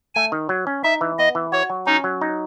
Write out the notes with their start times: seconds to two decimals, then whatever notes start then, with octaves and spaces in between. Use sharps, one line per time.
0.15 A3 G#5
0.32 D#3
0.49 F#3
0.67 C#4
0.83 D#4 E5
1.01 E3
1.19 B3 D#5
1.35 E3
1.52 F#4 C#5
1.70 F#3
1.86 C#4 D#4
2.04 F#3
2.21 D#4